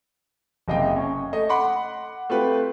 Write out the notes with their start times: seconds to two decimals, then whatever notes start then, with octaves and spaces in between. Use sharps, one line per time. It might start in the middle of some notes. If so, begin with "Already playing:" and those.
0.68 F#1 C3 D#5 F5 G5
0.96 C#4
1.33 A3 D#5
1.49 F#5 B5 C6 D6
2.30 A3 C4 F4 G4 B4